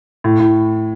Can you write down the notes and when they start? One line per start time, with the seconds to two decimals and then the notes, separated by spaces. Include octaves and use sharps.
0.24 A2
0.39 A2